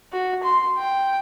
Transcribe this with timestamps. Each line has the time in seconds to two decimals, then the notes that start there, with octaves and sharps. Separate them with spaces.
0.12 F#4
0.43 C6
0.78 G5